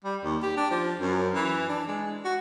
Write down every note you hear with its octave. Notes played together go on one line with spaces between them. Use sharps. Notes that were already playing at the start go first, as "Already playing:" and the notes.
G3
D#2
G4
D4
F3
F#2
E3
D4
G#3
F#4